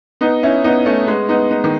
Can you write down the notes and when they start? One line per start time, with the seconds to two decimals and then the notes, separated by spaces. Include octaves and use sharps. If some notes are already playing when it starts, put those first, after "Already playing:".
0.21 B3 D#4
0.43 C#4 E4
0.64 B3 D#4
0.85 A3 C#4
1.07 G#3 B3
1.29 B3 D#4
1.51 B3 D#4
1.64 D#3